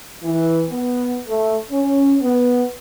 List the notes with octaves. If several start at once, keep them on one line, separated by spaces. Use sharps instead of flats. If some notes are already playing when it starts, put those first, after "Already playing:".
E3
B3
A3
C#4
B3